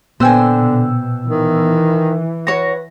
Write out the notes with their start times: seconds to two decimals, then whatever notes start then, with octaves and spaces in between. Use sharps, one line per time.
0.20 A#2 D3 B3 C5 G5 G#5 E6
0.55 B2
1.27 D#3 E3
2.47 F#4 B4 C#5 A#6